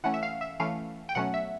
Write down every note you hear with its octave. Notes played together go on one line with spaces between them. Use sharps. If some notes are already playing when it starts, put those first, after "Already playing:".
E3 A3 C#4 F#5
E5
F5
E5
E3 A3 C#4 F5
G5
B2 F#3 A3 C#4 F#5
E5